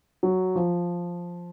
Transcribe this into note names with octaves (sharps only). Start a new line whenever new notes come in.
F#3
F3